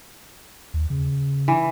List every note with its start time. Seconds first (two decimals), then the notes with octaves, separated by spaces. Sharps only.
0.74 D#2
0.90 C#3
1.48 E3